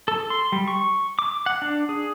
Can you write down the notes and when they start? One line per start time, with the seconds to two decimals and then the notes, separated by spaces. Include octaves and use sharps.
0.08 A4
0.30 C6
0.52 G3
0.68 C#6
1.19 D6
1.46 F#5
1.62 D4
1.89 G#4